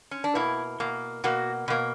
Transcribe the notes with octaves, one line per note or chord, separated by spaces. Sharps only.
C#4
D4
B2 A#3 E4
B2 A#3
B2 A#3 F#4
B2 A#3